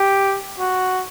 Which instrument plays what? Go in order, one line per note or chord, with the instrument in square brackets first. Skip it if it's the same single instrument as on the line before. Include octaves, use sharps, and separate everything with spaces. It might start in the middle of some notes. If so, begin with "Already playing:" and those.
Already playing: [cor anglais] G4
F#4